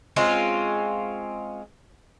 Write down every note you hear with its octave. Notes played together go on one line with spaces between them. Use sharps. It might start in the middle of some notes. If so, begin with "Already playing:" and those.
G#3 C4 C#4 F4